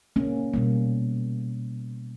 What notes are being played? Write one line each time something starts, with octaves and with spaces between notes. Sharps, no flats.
A#3 C#4
B2 G3 A#3